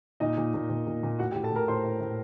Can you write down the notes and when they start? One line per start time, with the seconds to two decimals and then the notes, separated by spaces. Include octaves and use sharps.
0.20 A#2 D#4 D#5
0.37 A#2
0.54 A#2
0.70 A#2
0.87 A#2
1.03 A#2
1.19 A2 F#4 F#5
1.31 G4 G5
1.35 A2
1.43 A4 A5
1.51 A2 A#4 A#5
1.68 A2 C5 C6
1.85 A2
2.01 A2